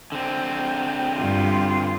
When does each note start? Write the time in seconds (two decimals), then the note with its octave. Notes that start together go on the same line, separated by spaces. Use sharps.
0.12 D3 C4
1.18 G2 F4